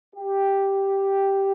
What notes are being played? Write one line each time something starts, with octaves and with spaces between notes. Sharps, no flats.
G4